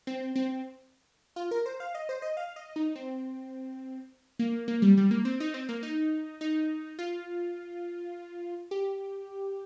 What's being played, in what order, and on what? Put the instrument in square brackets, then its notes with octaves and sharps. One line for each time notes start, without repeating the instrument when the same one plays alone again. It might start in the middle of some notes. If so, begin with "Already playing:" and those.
[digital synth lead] C4
C4
F4
A#4
C5
F5
D#5
C5
D#5
F5
D#5
D#4
C4
A#3
A#3
G3
G3
A#3
C4
D#4
C4
A#3
D#4
D#4
F4
G4